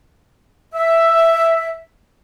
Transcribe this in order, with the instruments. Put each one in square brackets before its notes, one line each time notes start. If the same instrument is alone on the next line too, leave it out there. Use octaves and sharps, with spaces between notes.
[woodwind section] E5